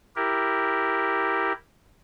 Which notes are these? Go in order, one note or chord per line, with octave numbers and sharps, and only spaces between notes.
E4 G4 A#4